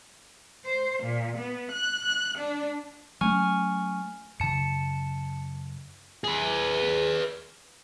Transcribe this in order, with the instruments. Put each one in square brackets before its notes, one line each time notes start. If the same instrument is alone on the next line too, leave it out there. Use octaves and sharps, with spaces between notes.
[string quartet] C5
A#2
B3
F#6
F#6
D4
[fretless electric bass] F#3 A3 C#4 [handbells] G#5 C#6 F6
[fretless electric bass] F#2 C#3 [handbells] A5 C#7
[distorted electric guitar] G#4 B4